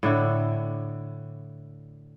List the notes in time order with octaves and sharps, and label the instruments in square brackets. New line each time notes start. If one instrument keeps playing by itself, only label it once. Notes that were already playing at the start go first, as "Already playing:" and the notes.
[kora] A2 D3 E4